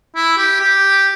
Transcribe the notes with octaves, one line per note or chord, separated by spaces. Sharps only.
E4
G4
G4